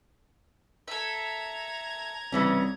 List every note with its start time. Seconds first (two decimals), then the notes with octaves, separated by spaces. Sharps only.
0.88 A4 E5 A#5 G#6
2.32 C2 C#3 E3 C#4